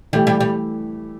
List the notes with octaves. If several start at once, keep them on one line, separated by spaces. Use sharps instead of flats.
E3 G3 A3 E4 G4
G3
G3